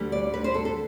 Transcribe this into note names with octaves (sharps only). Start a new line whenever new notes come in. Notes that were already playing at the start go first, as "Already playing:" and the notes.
Already playing: D2 D3 G3
D5
B4
C5
A4
A4